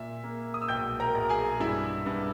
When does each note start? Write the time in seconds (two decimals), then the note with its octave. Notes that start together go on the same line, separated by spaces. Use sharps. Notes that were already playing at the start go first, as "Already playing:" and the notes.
Already playing: A#2 E5
0.24 A#3
0.54 D#6
0.62 E6
0.68 B1 G5 G6
1.00 A#4 A#5
1.15 B1
1.29 G#4 G#5
1.60 G2 E4 E5
2.06 G2